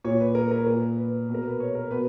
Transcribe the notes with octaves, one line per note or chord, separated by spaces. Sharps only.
A#2 C#5
B4
A#4
A#4
A#2 A#4
B4
B2
A#4
B4
C#5
A#4
B2 B4